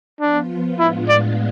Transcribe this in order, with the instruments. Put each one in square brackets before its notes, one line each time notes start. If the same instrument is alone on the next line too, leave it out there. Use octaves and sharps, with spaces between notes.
[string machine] F3 B3 F4 [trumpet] D4
[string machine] A2 G#3 B3 D4 F4 [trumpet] E4
[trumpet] D5